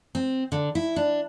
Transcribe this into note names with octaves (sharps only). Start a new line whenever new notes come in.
C4
D3
E4
D4